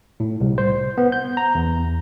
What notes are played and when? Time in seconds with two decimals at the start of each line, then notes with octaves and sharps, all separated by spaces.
0.20 A2
0.41 C2
0.58 C5
0.98 B3
1.12 G6
1.37 A#5
1.55 E2